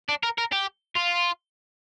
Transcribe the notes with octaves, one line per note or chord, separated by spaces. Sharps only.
D4
A#4
A#4
G4
F4